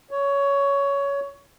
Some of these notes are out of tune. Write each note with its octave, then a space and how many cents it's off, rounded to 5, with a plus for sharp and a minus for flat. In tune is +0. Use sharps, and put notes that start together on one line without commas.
C#5 +15